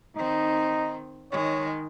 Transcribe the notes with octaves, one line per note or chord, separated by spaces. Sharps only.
D#3 C4 D#4
D#3 G#3 C#5